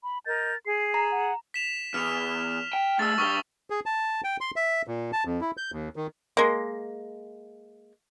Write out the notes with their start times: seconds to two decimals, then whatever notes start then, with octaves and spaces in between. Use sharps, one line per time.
0.03 B5
0.26 A#4 D#5 G6 A6
0.66 G#4 C7
0.94 A#5
1.11 F#5
1.54 B6 E7 F7
1.94 E2 F6 F7
2.73 G5
2.99 A3 G#4 E6 A6
3.18 G2 G3 C#6 D#6 G7
3.70 G#4
3.86 A5
4.24 G5
4.41 C6
4.56 E5
4.87 A#2
5.13 A5
5.25 F2
5.41 E4
5.57 G6
5.72 D#2
5.96 D#3
6.37 G#3 A#3